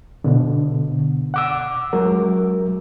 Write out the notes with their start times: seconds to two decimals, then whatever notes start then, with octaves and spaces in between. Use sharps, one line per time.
0.24 B2 D3
1.34 F#5 D6 E6
1.93 F#3 G#3 A#4